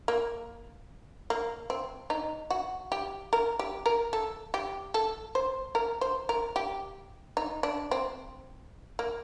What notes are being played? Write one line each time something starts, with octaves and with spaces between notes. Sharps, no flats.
A#3
A#3
C4
D#4
F#4
G4
A#4
G4
A#4
A4
G4
A4
C5
A#4
C5
A#4
G4
D#4
D4
C4
A#3